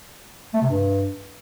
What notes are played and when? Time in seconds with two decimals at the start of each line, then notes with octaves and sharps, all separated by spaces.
0.54 A3
0.62 C3
0.69 G2